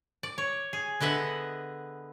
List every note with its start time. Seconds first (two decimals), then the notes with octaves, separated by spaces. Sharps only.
0.23 D5
0.38 C#5
0.73 G#4
1.00 D3 B3 D#5 E5 F#5